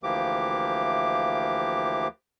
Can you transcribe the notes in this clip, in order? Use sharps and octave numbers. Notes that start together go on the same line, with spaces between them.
D2 E3 F3 A#3 G4 D6